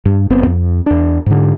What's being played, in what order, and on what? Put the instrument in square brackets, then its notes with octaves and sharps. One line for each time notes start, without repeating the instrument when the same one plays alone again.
[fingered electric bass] G2
F#1 B3 C4
F2
E2 D4
G#2 D3